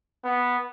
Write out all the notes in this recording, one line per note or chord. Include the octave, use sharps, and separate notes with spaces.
B3